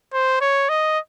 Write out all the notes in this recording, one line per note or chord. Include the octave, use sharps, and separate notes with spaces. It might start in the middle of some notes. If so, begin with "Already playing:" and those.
C5
C#5
D#5